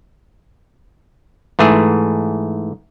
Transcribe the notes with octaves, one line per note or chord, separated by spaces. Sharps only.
G#2 E3 A3 G#4